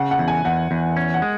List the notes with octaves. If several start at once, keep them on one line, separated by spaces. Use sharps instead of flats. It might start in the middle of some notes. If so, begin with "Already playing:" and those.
Already playing: C#3 F#5
F#5
E2
G#5
E2 F#5
E2
C#4
F#5
G#3